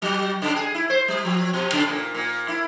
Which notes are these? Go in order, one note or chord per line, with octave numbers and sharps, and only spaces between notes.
F#3
C#3
G#4
E4
C5
G3
F3
B2
C#3
A#2
A#2
E4